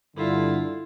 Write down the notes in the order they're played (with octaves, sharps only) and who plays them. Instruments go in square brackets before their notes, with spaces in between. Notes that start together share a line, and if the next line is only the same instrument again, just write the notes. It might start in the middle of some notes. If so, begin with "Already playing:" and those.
[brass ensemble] G2 D3 [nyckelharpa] E4 F4